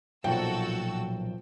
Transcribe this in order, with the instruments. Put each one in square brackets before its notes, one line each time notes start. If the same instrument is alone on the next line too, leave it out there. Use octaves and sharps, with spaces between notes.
[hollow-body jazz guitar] B1 [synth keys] A#2 F3 [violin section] F#4 A4 E6 [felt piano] G5